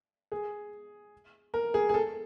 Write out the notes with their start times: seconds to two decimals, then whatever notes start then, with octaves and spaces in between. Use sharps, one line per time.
0.32 G#4
1.54 A#4
1.74 G#4
1.89 G#4
1.94 A4